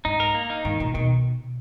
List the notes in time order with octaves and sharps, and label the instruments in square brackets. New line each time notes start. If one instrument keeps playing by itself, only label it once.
[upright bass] G#2 [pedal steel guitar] D#4
[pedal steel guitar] A#4
A#3
D#4
[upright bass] G#2 [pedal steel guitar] D#3
[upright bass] A#2 [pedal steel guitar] D#3
[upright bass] B2 [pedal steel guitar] D#3